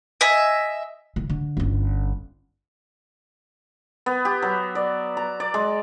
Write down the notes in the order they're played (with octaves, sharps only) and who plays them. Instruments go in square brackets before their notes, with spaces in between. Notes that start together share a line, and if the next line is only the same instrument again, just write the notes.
[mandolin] D#5 E5 G#5
[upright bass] D#3
D3
G1 C#4
[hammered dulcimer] B3
G4
F#3
D5
A#5
D5
G#3